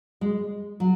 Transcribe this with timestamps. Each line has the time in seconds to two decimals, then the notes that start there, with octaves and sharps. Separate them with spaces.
0.21 G#3
0.80 F#3